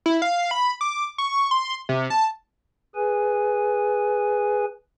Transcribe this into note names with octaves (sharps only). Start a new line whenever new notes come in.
E4
F5
B5
D6
C#6
C6
C3
A5
G#4 B4 G#5